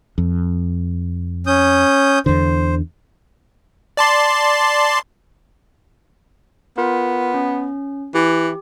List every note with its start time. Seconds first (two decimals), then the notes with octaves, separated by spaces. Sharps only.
0.18 F2
1.47 C#4 D#6 G6
2.26 E2 D3 C5
3.97 D5 A5 C6
6.78 B3 F4 A#4
7.34 C#4
8.15 E3 G4